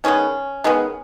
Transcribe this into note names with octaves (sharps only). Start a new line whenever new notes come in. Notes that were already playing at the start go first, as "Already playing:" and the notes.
D#3 G#3 B3 C#4
D#3 G#3 B3